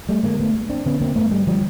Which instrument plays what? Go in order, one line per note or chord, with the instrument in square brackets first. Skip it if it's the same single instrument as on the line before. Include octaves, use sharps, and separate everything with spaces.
[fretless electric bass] G3 A3
D3 G#3 A#3
A3 B3
G2
C4 D4
D3 B3 C#4
A#3 C4
G2 A3 B3
G3 A3
D3 F3 G3